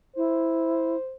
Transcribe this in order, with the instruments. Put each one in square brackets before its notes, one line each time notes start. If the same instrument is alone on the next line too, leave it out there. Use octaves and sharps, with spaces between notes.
[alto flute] E4 [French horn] C5